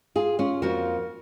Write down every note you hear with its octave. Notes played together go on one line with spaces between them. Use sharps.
F4 G#4
C#4 F4
F2 F3 A#3 F#4 A#4